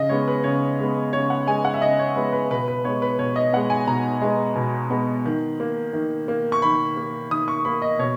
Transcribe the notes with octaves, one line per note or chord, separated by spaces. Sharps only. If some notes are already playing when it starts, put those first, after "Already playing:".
Already playing: C#3 D#5
G#3 B3 C#5
B4
C#3 C#5
G#3 B3
C#3 C#5
F#5
G#3 B3 G#5
F#5
E5
C#3 D#5
C#5
G#3 B3 B4
B4
B2 B4
B4
G#3 B3 C#5
B4
B2 C#5
D#5
G#3 B3 F#5
G#5
B2 A#5
G#3 B3
B2
G#3 B3
D#3
A#3
D#3
A#3
C#6
D#3 B5
A#3
D#3 D#6
C#6
A#3 B5
D#5
B2 C#5